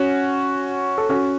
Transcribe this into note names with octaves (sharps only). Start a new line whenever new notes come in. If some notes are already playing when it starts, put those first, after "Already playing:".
Already playing: C#4 F#4
A4
C#4 F#4